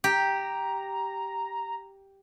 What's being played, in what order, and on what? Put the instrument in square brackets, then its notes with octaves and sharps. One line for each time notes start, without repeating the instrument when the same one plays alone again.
[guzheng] G4 [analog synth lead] A#5